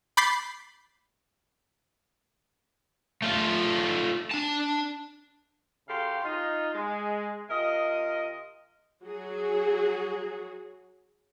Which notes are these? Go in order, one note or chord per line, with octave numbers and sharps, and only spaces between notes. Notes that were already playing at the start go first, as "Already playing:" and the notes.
B5 D6 G6 A6 B6 C7
A3 F4
D4 A5
C#3 F#4 G4 A4 F5 C6
D#4 F4 D#5
G#3
C3 F4 A#4 D#5
F#3 F#4 G#4